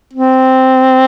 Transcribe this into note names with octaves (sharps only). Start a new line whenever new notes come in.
C4